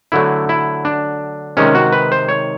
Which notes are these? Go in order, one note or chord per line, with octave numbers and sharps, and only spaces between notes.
D3 F#3 A3 E4
E4
D4
C3 D#3 G#3 C#4
F#4
B4
C5
C#5